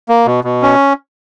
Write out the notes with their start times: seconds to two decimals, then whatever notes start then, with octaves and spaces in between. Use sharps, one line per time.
0.09 A#3
0.26 B2
0.44 B2
0.62 C#4